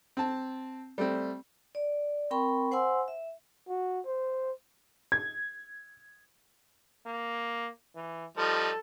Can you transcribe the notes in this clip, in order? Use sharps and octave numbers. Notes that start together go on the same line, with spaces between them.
C4 A5
G3 A3 C4
D5
C4 A#4 G5 B5 C#6
C5 F#5 G#5 C6 E6
E5
F#4
C5
G#6
A#3
E3
F3 G3 D#4 A4